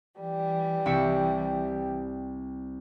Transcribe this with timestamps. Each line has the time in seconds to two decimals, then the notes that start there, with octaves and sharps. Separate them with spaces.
0.19 E3 G3
0.86 C2 E5 C#7